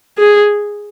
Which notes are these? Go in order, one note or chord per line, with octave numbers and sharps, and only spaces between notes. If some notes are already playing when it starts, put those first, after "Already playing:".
G#4